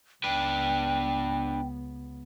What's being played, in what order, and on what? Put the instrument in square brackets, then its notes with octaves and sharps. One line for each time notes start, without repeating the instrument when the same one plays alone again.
[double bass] C#2 B3 [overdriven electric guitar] D4 B4 [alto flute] G5